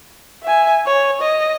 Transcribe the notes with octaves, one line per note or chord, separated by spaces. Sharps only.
E5 G#5
C#5
D#5